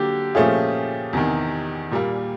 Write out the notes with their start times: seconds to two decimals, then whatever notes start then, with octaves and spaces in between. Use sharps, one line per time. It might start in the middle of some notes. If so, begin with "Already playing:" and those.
Already playing: D3 F#3 A#3 G4
0.35 A#2 F3 A3 C#4 F4 G#4
1.13 E2 C3 D#3
1.91 A#2 G3 A#3